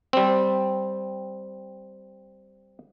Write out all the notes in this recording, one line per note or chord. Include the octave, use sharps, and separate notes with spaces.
G3 C4